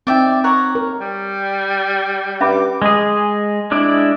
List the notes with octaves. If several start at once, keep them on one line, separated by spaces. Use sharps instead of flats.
C4 D#4 D5 E5 G5
C#5 F#5 A#5
A#4
G3
G2 C#4 E5 B5 D6
G#3 G#4
G#3 D4 E4 D5